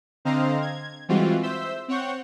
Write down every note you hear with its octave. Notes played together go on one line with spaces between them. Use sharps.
D3 C4 C5 D#5 F5 A#5
G#6
E3 G3 G#3 C4 F4 F#4
C5 E5 E6 G6
C4 C#5 F#5 C#6 G6